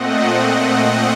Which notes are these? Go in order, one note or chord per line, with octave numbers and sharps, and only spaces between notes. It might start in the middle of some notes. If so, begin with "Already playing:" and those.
Already playing: A#2 A3 C4 D#5 F#5